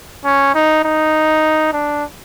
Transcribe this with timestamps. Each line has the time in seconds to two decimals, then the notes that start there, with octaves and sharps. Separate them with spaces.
0.25 C#4
0.55 D#4
0.84 D#4
1.73 D4